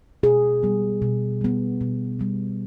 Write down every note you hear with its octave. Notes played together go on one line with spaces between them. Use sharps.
B2 G#4
G3 B3
B2
G3 B3
B2
G3 B3